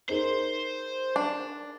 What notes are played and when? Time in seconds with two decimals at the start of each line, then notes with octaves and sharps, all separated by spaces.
0.09 D#4 G#4 A#4 C5
1.16 D4